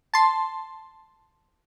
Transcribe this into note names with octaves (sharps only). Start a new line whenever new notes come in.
A5 C6